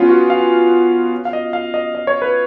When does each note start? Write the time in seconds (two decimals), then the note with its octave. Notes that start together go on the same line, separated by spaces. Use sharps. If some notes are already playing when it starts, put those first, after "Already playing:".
Already playing: B3 C#4 F4
0.09 F#4
0.30 F5
1.25 F5
1.33 D#5
1.53 F5
1.74 D#5
1.95 D#5
2.07 C#5
2.22 B4